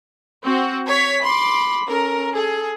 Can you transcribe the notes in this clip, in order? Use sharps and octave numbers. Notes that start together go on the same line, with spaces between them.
C4 F#4
C#5 G#6 B6
B5 C6 D6
C#4 A4 A#4
G#4 A4